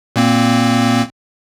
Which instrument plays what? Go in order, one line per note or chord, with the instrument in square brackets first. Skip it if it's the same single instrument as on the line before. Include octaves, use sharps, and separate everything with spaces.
[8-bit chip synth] A#2 A#3 C4